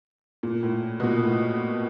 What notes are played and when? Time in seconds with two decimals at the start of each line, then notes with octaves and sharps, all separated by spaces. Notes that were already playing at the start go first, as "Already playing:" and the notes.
0.43 A#2
0.63 A2
1.00 B2
1.03 A#2
1.24 A2